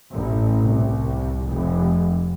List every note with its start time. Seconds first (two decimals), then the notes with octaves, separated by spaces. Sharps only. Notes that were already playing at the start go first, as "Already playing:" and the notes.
0.12 A1
0.62 C2
1.45 F1